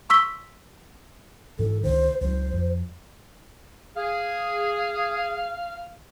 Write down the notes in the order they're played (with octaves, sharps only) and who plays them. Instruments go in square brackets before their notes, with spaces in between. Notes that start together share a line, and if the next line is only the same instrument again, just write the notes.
[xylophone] C6 C#6 E6 B6 G7
[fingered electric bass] G#2 E3 [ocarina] A4
[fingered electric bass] C#2 D#3 [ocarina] C5
[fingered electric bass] C#2 F#3 [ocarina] C5
[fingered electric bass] F2
[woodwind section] G#4 [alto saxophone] F5